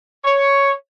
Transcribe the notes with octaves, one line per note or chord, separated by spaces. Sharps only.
C#5